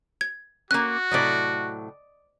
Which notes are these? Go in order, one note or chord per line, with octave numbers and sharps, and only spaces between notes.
G#6
A#3 C#4 F#4 F#6
A2 C3 F#3 D5 D#5